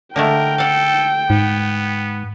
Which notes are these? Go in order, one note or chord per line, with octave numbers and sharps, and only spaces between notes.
D3 G#3 A3 A#4 G5
A4 F5 F#5
G#2 B3